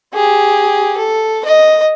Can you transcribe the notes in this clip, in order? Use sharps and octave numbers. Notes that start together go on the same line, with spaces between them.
G4 G#4
A4
D#5